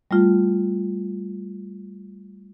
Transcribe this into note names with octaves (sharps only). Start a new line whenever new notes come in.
G3 A3 F4